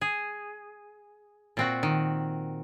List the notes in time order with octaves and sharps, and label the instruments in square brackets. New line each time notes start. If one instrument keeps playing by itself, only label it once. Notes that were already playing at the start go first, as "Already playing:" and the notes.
[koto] G#4
A#2 C4 F#4
D#3